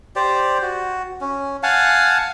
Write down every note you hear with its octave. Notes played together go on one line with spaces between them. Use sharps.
G4 C5 D5
F#4
C#4
F5 F#5 G#5 A5